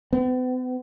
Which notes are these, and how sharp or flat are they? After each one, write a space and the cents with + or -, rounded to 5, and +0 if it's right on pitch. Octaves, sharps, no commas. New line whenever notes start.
B3 +45